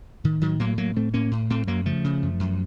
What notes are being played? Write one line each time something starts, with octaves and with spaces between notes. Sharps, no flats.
A2 D#3
A2 D#3 F#3
A2 F#3 A#3
A2 F#3 A#3
A2 A3 C4
A2 A#3 C#4
A2
A2 A3 C4
F#2 F#3 A#3
C#3 F3 A3
C#3
F#2
F#2